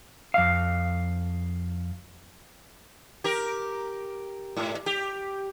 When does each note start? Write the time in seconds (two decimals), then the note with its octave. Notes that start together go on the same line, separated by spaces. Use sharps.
0.34 F2 F5
3.24 G4 A#4
4.57 G#2
4.86 G4